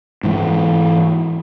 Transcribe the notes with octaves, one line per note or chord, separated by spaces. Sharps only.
G#2 E3